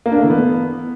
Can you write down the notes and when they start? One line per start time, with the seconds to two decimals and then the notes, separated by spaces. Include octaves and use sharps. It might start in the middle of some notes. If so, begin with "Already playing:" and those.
0.06 A#3
0.12 D4
0.18 A3
0.24 E3
0.30 B3